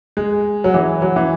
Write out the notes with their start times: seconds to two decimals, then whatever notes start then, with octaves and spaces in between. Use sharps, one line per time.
0.17 G#3
0.64 F#3
0.74 E3
1.02 F#3
1.16 E3